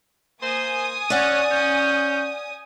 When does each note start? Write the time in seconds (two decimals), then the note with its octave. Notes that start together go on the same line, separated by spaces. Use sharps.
0.41 A#3 C5 G#5 D#6
1.10 C#4 D5 F#5 F#6
1.50 C#4 G6